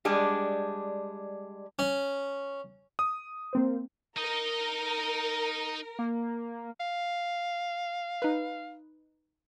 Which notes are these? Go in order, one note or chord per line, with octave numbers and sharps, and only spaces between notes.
G3 G#3 D4
C#4
D#6
A#3 C4 C5
D#4 A#4 D#5
A#3
F5
D#4 B4